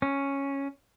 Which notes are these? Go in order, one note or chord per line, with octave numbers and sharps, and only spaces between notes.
C#4